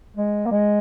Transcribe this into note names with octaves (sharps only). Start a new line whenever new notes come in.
G#3
A#3
G#3